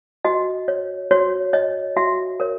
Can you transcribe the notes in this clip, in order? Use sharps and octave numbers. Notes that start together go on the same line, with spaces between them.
F#4 D#5
C#5
F#4 C#5
C#5 D#5
F#4 E5
A#4 C#5